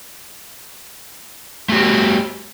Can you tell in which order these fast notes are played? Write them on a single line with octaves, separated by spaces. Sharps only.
A3 F#4 G4